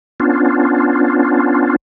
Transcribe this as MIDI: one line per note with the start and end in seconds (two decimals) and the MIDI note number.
0.20 1.76 59
0.20 1.76 61
0.20 1.76 62
0.20 1.76 65